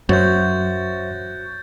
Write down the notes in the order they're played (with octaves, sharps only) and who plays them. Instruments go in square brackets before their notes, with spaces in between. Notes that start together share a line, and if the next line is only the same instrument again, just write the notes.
[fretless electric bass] F#2 [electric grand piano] F#4 [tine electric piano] C5 C#5 E5 [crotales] G6 A6